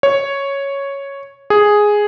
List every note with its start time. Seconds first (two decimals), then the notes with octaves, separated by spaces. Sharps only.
0.03 C#5
1.50 G#4